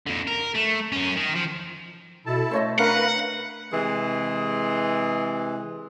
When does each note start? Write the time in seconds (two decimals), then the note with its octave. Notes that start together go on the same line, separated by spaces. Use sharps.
0.07 F2 D3
0.28 A#4
0.55 A3
0.92 F#2 C#4
1.16 D#3
1.35 F3
2.26 B2 E4 A4 A5
2.51 A3 C5 C#5 D#5
2.79 D4 A#4 B4 F5 F#5 A#5
3.72 C3 E3 G#3